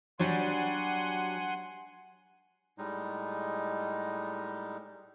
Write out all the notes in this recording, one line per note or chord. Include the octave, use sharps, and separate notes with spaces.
F#3 G3 D4 F#5 G#5 C6
A2 G3 G#3 D#4